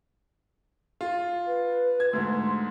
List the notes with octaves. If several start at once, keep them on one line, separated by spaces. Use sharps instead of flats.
F4
B4
G#6
D2 G#2 C6